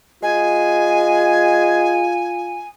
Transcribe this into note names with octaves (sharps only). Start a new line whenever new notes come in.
G#3 F4 G#5